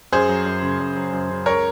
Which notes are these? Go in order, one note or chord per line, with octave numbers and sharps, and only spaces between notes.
F#2 G#4 C5
F#3
F#2
C#3
F#2
F#3
F#2
C#3
C#2 A#4 C#5